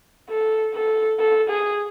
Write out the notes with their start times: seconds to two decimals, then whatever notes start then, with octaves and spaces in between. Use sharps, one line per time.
0.29 A4
0.74 A4
1.20 A4
1.50 G#4